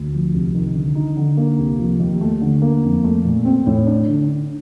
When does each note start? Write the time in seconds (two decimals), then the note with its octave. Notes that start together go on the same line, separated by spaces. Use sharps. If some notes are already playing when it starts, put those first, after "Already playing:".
Already playing: D2
0.13 F3
0.34 C2
0.55 D#3
0.75 D3
0.95 D#4
1.17 D3
1.37 A#3
1.59 C2
1.79 F3
2.00 D#2
2.21 A3
2.41 D3
2.62 A#3
2.83 F2
3.04 A3
3.25 A#2
3.45 C4
3.67 A2
3.87 D4
4.08 D3
4.28 D4